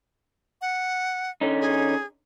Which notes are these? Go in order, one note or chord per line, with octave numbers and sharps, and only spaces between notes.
F#5
D3 C#4 D#4
G#4